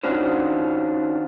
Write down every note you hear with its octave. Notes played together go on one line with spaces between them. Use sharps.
D#3 C#4 D4 F4 F#4 C5